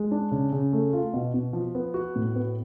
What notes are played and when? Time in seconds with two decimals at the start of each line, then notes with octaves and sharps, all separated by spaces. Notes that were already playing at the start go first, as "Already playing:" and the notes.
Already playing: G#3
0.11 D4
0.31 C#3
0.52 C#3
0.73 A3
0.93 F4
1.14 B2
1.34 B2
1.53 F3
1.75 B3
1.94 F#4
2.16 A2
2.36 B3